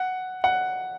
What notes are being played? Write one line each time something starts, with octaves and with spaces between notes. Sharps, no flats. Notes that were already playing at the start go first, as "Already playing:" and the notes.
Already playing: F#5
F#5